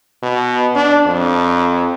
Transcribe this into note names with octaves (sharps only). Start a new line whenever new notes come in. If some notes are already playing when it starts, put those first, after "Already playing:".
B2
D4
F2